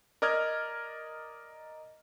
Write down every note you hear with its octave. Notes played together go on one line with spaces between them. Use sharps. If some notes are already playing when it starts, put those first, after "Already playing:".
A#4 D5 D#5 F6 G#6